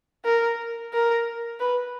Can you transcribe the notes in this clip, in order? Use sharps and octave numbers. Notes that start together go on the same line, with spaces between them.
A#4
A#4
B4